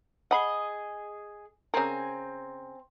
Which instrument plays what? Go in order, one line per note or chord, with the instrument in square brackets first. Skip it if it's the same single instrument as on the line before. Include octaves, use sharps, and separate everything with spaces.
[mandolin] G#4 D#5 [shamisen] F#5 B5
[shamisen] C#3 A#4 [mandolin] C4 G#5 A#5